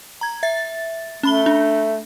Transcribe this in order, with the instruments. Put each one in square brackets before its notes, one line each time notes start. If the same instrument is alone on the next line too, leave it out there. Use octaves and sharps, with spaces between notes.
[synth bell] A#5 G#6
E5 A6
[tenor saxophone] A3 [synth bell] C#4 B5 G7
[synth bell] D4